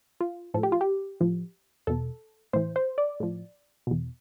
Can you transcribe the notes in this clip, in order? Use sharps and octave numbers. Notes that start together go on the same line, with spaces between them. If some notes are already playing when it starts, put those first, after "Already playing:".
F4
A2 F3 A4
G4
F4
G4
A2 F3
E2 B2 A4
A2 E3 C5
C5
D5
A2 F3
E2 B2